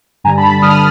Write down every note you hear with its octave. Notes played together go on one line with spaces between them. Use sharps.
G2 D3 G3 G#5 A#5
A5 B5
G2 D3 G3 D#6 F6